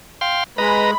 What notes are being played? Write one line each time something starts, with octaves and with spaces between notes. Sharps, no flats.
F5 G5 C6
G#3 B4 D#5 A#5 B5